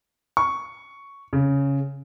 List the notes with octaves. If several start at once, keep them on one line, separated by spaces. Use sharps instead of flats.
C#6
C#3